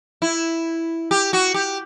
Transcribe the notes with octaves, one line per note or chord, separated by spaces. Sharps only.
E4
G4
F#4
G4